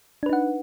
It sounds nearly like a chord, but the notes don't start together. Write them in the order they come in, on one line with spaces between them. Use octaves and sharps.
D4 B4 D#4 F#5